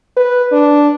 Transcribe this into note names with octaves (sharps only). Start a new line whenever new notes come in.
B4
D4